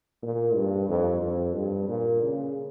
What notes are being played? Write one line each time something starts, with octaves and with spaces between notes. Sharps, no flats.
A#2
G2
F2
F2
G2
A#2
C#3